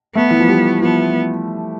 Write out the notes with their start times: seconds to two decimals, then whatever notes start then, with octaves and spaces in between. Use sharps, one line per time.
0.15 A3 B3
0.31 E3
0.40 F3
0.49 G3
0.82 F3 B3